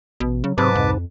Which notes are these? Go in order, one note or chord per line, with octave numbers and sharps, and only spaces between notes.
A1 B2
C#3 F#3
G#2 C3 F#3 B4 A5 D6
C2 F2